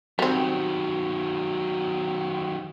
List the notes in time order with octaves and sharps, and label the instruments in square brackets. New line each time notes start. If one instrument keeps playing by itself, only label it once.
[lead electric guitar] D#3 F#3 [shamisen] G3 C4